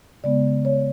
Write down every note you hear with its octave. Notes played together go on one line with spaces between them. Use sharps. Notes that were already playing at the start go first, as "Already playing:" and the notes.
C#3 G#3 B3 D5
C#5